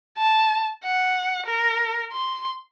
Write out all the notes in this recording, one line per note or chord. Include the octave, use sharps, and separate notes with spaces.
A5
F#5
A#4
C6